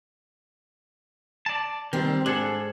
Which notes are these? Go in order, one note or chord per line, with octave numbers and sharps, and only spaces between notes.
D5 A5
D#3 G3 C4
G#2 D4 G#4 A4